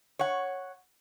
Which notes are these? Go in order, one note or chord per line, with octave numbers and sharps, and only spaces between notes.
C#5 F#5